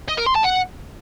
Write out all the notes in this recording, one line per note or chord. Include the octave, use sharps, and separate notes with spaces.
D#5
A#4
C6
A5
F#5